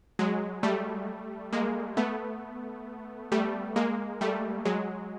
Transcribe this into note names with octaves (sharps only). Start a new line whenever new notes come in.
F#3 G#3
G3 A3
G#3 A#3
A3 B3
G3 A3
G#3 A#3
G3 A3
F#3 G#3